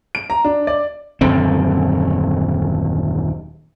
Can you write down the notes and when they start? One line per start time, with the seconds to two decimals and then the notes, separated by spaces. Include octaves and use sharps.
0.15 D7
0.30 A#5
0.44 D4
0.67 D5
1.21 D#1 F#2 D3 C4